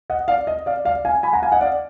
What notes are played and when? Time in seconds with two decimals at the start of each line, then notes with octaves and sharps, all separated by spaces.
0.10 D#5 F#5
0.28 D5 F5
0.47 D#5
0.66 D5 F5
0.85 D5 F5
1.05 F5 G#5
1.23 G#5 B5
1.33 F#5 A#5
1.42 F5 G#5
1.51 D#5 F#5
1.61 D5 F5